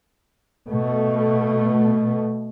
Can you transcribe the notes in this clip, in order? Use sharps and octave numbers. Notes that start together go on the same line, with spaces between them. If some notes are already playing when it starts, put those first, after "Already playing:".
B2 A3